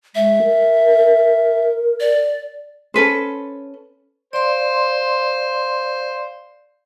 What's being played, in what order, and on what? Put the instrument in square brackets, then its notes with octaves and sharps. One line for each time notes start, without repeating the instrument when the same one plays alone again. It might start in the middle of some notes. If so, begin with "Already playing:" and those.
[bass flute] G#3 [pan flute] E5
[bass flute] A#4
[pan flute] D5
[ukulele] C#4 A4 B4 C5
[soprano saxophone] C5 [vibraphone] D5 F5 C6